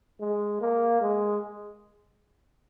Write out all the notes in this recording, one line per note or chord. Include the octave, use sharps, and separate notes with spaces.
G#3
A#3
G#3